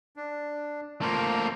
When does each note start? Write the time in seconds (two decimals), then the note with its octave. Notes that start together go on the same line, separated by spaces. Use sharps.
0.16 D4
1.02 A3 A#3 F4 C5 A#5